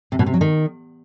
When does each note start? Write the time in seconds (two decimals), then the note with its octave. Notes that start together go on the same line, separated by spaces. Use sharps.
0.12 C3
0.19 B2
0.26 C3
0.34 F#3
0.41 D#3